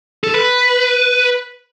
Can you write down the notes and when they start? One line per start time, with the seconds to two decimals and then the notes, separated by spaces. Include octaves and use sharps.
0.24 A4
0.34 B4